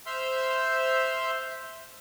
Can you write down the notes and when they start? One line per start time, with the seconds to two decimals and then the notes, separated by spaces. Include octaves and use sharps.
0.06 C5 E5 C6 E6 F6 G6